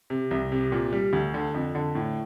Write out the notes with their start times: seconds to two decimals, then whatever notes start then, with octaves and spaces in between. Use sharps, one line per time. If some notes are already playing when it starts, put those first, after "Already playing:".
0.10 C3
0.31 C2
0.52 C3
0.72 A#2
0.93 G3
1.13 D2
1.34 D3
1.54 F2
1.75 D3
1.95 A2